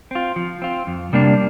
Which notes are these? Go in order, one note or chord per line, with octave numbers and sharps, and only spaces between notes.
C4 F4
F3
C4 F4
F2
C3 G3 A#3 D4